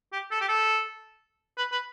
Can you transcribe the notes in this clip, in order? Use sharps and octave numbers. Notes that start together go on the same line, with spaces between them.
G4
A4
G4
A4
B4
B4